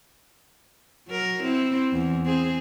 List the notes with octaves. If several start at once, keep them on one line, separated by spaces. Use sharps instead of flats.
F#3 A#4
C4 E4
E2 E3
C4 G#4